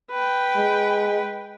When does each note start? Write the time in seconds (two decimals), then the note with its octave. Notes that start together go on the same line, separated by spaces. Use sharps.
0.11 B4 G5
0.56 G#3